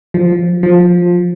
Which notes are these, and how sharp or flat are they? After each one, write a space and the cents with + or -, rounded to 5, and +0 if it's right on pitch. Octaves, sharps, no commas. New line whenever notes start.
F3 +0
F3 +15